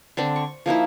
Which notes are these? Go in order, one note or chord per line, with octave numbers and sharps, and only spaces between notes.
D3 C4 D4
C#6
F3 A#3 D#4 E4